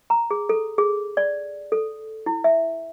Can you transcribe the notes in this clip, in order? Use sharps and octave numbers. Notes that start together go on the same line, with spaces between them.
A#5
G#4
A4
G#4
D5
A4
E4
E5